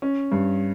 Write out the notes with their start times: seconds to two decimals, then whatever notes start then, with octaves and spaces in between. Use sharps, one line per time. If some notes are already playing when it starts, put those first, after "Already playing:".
0.02 C#4
0.32 G2